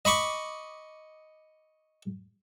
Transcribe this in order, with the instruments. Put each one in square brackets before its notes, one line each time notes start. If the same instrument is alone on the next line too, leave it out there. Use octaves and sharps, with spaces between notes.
[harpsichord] D#5 B5 C#6 D6